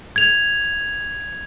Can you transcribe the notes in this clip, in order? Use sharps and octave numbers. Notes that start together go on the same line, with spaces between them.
G#6 F7